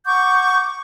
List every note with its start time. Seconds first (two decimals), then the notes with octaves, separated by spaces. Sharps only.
0.06 F#5 C#6 D6 G6